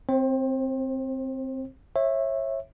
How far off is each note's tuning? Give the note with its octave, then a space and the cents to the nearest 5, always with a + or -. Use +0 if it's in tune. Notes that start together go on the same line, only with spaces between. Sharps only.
C4 +0 C5 +35
C#5 -30 E5 +0